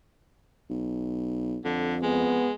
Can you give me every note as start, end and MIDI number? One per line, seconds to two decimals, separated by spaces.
0.70 1.58 35
1.65 2.47 41
1.65 1.95 50
2.02 2.53 56
2.02 2.50 59